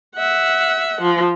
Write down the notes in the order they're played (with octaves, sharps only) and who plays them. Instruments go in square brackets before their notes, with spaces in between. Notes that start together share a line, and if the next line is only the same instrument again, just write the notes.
[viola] E5 F#5
F3